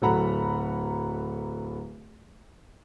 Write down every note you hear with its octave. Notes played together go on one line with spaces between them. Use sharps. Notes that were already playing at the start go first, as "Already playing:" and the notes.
D1 F#3 A4 F#5 A#5 B5